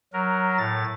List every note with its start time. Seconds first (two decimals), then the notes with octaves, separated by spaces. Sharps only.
0.13 F#3 A#4
0.58 A2 A6